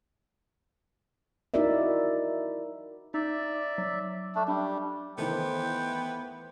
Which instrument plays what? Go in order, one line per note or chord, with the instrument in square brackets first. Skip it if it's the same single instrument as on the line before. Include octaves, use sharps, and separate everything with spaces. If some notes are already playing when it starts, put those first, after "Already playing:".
[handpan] D#4 E4 F#4 A#4 D5 E5
[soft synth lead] D#4 [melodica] D5 E5
[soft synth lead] F#3
[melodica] A3 D4
[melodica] G3 [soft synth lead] D4
[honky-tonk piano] D#3 E3 A3 [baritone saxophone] B3 [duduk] C5 [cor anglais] G5